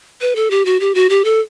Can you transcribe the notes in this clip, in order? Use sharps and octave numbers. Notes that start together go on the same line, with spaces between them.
B4
A4
G4
F#4
G4
F#4
G4
A4